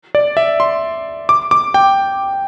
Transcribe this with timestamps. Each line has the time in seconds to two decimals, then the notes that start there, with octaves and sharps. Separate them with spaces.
0.15 D5
0.37 E5
0.60 C6
1.29 D6
1.51 D6
1.74 G5